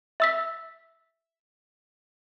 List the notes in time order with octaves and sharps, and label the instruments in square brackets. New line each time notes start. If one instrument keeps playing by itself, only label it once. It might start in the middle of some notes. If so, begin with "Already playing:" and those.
[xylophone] E5 E6 B6